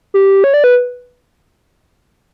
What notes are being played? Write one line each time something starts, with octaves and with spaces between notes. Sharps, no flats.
G4
C#5
D5
B4